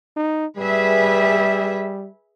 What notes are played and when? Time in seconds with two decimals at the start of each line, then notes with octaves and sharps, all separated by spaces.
0.16 D#4
0.56 G3 G#4 B4 E5